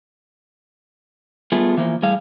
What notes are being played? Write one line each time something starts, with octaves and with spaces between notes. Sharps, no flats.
G3 A3 B3 F4 G#4
E3 F3 A#3
A2 G3 G#4 F5